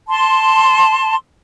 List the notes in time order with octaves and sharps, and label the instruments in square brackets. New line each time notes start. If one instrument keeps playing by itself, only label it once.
[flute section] A5 C6